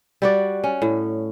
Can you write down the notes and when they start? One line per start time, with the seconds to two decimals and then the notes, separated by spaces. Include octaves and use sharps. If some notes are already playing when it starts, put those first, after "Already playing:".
0.22 G3 F#4 D5
0.64 C#4
0.82 A2